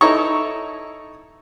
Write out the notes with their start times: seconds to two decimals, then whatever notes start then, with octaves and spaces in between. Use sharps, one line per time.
0.01 D#4 E4 A4 C#5 A#5 C#6